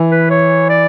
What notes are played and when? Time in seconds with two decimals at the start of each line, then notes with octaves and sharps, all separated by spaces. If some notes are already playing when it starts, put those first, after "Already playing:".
Already playing: E3
0.11 B4
0.30 C#5
0.69 D5